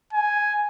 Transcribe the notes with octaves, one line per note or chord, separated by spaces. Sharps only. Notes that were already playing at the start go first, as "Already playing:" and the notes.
G#5